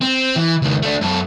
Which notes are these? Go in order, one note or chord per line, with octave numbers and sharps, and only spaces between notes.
C4
E3
C#2 D#3
A3 D4
F#2 A4